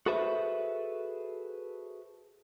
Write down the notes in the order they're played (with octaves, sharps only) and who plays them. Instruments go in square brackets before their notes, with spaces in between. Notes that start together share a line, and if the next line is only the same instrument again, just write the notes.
[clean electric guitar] F#4 G#4 A4 B4 C5 E5